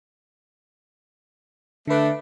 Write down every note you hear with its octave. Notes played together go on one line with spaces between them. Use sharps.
D3 A3 D4 B4